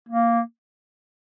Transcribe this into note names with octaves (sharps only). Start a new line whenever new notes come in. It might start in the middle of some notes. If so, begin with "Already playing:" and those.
A#3